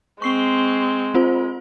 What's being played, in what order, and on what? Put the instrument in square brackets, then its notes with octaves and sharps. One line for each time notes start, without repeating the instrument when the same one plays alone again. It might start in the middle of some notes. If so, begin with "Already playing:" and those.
[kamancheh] G#3 [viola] C4 [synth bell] C#6 C7 G7
[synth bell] C4 F4 C5